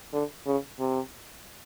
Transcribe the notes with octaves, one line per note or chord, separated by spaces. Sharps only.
D3
C#3
C3